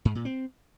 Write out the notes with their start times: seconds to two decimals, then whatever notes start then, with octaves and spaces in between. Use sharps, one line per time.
0.05 G#2
0.15 A#2
0.25 C4